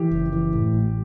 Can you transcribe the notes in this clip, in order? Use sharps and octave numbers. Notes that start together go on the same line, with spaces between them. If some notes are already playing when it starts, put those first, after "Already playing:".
Already playing: E3 G4
F#1
E3
A2
A1